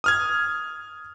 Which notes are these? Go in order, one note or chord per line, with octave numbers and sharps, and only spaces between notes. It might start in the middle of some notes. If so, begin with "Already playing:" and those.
D#6 F6 G#6